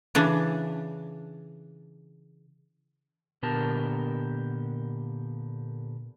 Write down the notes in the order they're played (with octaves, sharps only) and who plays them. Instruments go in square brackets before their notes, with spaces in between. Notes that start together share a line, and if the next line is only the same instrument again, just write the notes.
[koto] C#3 E3 D4
[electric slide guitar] A#2 D3 B3 G4 A#4 A5